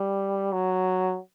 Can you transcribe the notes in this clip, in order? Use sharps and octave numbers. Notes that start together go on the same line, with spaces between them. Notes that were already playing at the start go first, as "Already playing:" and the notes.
Already playing: G3
F#3